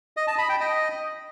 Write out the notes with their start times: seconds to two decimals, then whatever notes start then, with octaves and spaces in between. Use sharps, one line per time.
0.17 D#5
0.28 A5
0.38 B5
0.49 G5
0.60 D#5